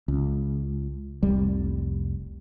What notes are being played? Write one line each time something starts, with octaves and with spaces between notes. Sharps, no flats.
C#2
F1 C2 G3